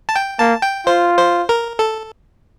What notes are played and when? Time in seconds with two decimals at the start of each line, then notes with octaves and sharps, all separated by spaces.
0.09 A5
0.16 G5
0.39 A#3 A5
0.62 G5
0.87 F4 C5
1.18 C5
1.49 A#4
1.79 A4